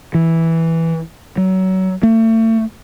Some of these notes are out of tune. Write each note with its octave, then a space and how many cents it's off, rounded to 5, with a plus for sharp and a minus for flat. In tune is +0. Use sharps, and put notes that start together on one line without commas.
E3 -5
F#3 +25
A3 +35